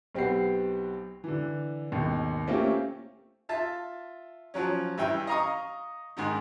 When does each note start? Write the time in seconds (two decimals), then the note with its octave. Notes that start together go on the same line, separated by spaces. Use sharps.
0.15 B1 C4 G4 B4 F#5 C7
1.24 D3 E3
1.92 G#1 D#2 B2
2.47 A3 A#3 C4 C#4 F4 G4
3.49 F4 E5 A5
4.54 F3 F#3 C#4
4.98 G2 E3 E5 G5 E6
5.27 D#5 F5 A#5 C#6 D#6
6.17 G#2 D#3 D#4